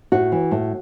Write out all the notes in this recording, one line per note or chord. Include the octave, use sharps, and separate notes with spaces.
A2 F#4
E3
A2